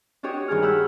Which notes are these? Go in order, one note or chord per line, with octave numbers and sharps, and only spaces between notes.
D4 F#4 G4 C#5 D#5
G2 D#3 D4 G#4 F6
F#5 B5 E6 F6 G6